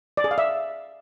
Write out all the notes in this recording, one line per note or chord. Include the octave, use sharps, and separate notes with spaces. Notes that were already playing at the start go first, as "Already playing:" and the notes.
D5
G#4
F5
E5